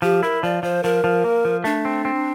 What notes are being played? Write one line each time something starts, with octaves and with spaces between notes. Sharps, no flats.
F3 G4
E4 A#4
F3 D5
F3 C5
F3 A#4
F3
A#3
F3
A3 D4
C4
C4